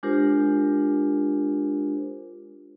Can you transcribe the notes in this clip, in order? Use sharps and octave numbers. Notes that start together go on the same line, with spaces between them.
G#3 D4 F4 G4 A#4 C5